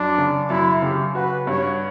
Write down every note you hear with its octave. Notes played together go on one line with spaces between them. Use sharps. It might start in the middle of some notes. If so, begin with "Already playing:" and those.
Already playing: F#2 D4
C#3
F#2 E4
C#3 G4
F#4 B4
G2 C#5